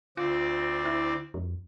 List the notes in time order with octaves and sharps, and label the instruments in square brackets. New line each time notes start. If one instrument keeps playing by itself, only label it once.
[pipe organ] D2 C4 D5 [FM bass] F4
[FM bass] E4
F2